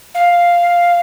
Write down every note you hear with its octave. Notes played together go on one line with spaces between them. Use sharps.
F5